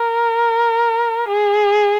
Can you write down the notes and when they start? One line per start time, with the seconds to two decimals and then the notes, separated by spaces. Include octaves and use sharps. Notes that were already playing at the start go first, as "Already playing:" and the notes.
Already playing: A#4
1.28 G#4